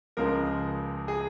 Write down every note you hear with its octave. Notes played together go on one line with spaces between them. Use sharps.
C#2 C#3 F3 G#3 A#4
G#4